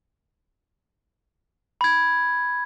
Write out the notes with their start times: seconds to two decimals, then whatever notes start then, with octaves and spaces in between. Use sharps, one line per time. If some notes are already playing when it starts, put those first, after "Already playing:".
1.81 B5 G#6